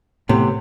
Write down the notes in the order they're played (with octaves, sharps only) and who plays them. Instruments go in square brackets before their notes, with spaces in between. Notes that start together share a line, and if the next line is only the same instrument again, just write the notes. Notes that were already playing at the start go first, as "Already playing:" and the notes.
[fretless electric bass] A2 [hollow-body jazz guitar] C3 E3 B3